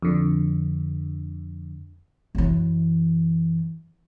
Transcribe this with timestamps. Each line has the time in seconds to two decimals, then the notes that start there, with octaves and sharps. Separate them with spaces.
0.02 F2 D3
2.35 F#2 E3